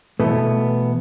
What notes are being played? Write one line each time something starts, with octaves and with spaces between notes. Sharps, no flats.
B2 E3 A3 B3